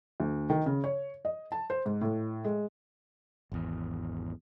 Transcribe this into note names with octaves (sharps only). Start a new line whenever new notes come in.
D2
D#3
C#3
C#5
D#5
A5
C5
G#2
A2
G#3
G#1 E2